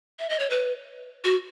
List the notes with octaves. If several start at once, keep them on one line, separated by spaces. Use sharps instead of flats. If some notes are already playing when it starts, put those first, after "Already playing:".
E5
D#5
C#5
B4
F#4